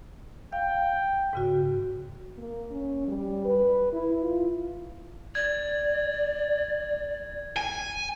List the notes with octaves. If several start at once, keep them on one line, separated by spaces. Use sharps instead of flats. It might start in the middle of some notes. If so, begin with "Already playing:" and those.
F5 G5
G#2 C#3 F#4
A#3
C#4
G3
B4
E4
F4
D5 G#6
G#5